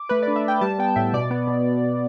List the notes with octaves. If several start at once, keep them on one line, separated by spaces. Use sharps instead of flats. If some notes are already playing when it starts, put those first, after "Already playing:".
Already playing: D6
A3 B4
D4 D5
E5
D4 G5
G3 A5
B3 G5
A2 E5
B2 D5
B3
B2